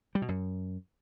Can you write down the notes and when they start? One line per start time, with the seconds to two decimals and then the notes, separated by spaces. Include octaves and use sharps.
0.15 G3
0.22 B2
0.28 F#2